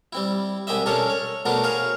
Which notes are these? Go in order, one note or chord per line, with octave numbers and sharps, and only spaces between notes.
G3 C4 E4
C2 G#3 G4 C5 D#5 E5
C#4 D4 A4 A#4 C#5
C#5
A3 B3 D4 D#4 F#4 A#4
G#4 A#4 C5 C#5 F5